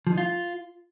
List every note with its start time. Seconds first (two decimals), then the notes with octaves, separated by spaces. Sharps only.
0.07 F3
0.12 D#4
0.18 F4